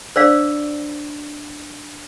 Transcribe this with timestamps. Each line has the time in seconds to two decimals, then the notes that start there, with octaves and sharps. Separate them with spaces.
0.16 D4 C5 D5 F5 E6